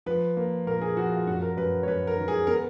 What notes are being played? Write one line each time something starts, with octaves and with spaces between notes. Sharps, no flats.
F3 B4
A#3
A#2 A#4
G#4
F3 F#4
F4
F#2 F#4
A#4
F#2 B4
C#5
F#2 B4
A#4
D#3
G#4
B3 A#4